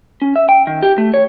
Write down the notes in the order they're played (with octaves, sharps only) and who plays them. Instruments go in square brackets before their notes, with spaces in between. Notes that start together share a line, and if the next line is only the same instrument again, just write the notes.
[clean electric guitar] C#4
E5
G5
D#3
G4
A3
C#5